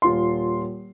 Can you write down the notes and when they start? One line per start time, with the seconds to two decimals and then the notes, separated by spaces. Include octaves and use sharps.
0.02 D#1 F4 C6